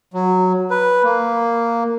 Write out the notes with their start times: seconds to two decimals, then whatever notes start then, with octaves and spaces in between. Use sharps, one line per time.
0.14 F#3
0.70 B4
1.04 A#3